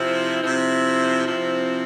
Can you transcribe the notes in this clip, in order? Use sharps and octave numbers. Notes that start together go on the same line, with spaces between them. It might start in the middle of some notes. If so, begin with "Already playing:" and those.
Already playing: C3 F3 C4 E4
C3 F3 C4 E4
C3 F3 C4 E4